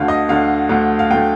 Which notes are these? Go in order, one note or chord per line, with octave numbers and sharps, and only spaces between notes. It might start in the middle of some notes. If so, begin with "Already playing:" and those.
Already playing: D2 D3 A3 F5
D#5
D2 D3 A3 F5
D2 D3 A3
F5
D2 D3 A3 G5